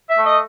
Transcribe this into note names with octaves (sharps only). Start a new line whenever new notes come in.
E5
A3
D#5